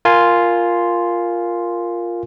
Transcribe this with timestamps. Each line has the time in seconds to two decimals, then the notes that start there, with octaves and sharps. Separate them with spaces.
0.05 F4 A#4 G#5 C6